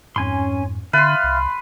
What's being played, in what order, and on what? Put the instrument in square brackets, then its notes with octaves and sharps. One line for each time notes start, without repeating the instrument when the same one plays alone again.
[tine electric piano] F2 G#2 [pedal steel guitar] C#4 G#5 C6
[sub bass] D3 [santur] B4 C6 [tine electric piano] E5 A6 [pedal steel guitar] F5
[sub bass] C2